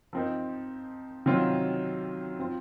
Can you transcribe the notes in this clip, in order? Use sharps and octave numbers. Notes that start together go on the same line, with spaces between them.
F3 C4 D#4 A#4
C3 D#3 F#3 C4 F4
F3 C4 F4